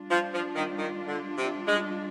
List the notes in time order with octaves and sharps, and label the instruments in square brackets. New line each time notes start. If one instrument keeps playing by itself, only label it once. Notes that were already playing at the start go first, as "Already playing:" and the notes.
Already playing: [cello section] G3 D4 F4
[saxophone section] F3
F3
D#3
D#3
D3
C3
G#3